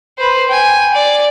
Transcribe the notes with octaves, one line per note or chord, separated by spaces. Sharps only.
B4 C5
G5 G#5
D5